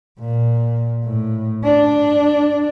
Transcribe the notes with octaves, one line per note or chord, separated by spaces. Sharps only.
A#2
A2
D4